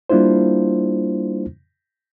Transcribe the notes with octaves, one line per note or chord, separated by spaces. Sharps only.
G3 A#3 D4 E4 F4 C5